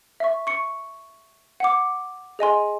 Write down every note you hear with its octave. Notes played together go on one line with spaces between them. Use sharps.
E5 C#6
C#6 C#7
F#5 D6
G#4 D#5 G#5 C6